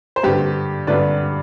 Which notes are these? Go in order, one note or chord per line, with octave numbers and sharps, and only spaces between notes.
C5
G2 D3 G4 B4
G2 D3 B4 D5